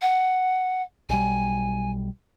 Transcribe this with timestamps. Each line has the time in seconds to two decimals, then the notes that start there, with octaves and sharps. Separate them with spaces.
0.01 F#5
1.09 B1 G3 G#5